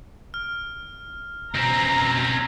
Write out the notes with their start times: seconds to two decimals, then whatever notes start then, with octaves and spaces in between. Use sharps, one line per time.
0.34 F6
1.55 B2 C4 C#4 A#5 A#6